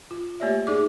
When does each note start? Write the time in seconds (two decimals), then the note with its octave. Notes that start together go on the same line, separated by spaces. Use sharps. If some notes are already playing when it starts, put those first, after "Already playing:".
0.11 F4
0.40 A3 A#3 G4 C#5 D5 E5
0.67 D#4 G#4 D5 D6